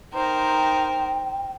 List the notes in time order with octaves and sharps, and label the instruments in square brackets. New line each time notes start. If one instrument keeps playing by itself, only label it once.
[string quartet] D#4 A#4 C5 [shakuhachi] G5